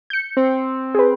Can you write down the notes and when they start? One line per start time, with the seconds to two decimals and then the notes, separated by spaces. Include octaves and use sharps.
0.10 G6 C#7
0.37 C4
0.95 G#4 B4